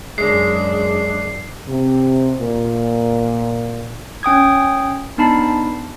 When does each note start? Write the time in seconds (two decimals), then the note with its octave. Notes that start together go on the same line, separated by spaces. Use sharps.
0.18 F#2 G#3 D4 G#4 C7
1.69 C3
2.40 A#2
4.23 C#4 G5 D#6 G#6
5.18 B3 D4 D#4 A5 B5 C7